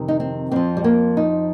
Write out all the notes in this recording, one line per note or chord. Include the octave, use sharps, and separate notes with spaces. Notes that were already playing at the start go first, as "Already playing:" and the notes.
Already playing: F2 C3 D#3
D#4
C4
F2 F3 C4
G3
A#3
D#4